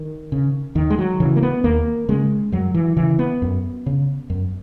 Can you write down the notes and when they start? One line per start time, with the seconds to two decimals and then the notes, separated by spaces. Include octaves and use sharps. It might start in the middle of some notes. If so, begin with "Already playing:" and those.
Already playing: D#3
0.32 C#3
0.75 D#2 D#3
0.90 G#3
0.98 F#3
1.20 C#3 E3
1.36 A#3
1.43 B3
1.64 D#2 A#3
2.09 C#3 G#3
2.52 F#2 F#3
2.74 E3
2.97 C#3 E3
3.19 B3
3.42 F#2
3.86 C#3
4.30 F#2